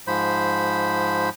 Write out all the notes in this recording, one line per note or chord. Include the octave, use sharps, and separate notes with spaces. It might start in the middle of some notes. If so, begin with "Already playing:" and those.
G#2 F3 C5 B5